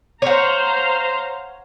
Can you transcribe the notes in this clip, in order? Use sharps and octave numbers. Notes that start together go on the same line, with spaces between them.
C5 C#5 F5 F#5 A#5